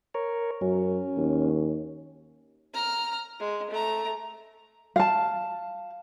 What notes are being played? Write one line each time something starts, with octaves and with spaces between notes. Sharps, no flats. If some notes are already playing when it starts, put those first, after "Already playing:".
A#4 C#5
F#2 C#4
D#2
A#5 F6
G#3
A3 A#5
F5 A5